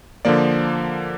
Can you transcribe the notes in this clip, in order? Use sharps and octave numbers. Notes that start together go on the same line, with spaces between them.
D3 F3 A#3 D5